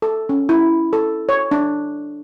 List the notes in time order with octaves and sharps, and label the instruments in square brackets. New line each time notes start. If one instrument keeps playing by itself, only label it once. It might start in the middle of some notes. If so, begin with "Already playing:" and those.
[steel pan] A4
C#4
E4
A4
C#5
D4